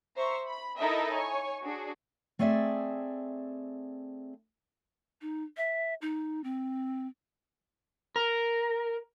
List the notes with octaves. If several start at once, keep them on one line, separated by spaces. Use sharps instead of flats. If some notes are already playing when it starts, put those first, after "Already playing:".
C5 E5 A#5 C#6
B5
D#4 E4 A4 A#4 D#5 E5
C#5 G#5 C#6
D4 F#4 G#4
A3 C4 G#4 D5 E5
D#4
E5
D#4
C4
A#4